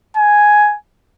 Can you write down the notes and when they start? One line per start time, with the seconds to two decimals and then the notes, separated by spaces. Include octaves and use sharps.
0.17 G#5